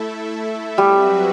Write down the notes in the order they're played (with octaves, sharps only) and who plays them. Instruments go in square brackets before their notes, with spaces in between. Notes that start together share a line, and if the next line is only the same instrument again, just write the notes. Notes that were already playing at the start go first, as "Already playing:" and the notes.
Already playing: [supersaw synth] A3 E4 A4 E5
[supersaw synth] F#3 C4 F#4 B4 E5 [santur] G3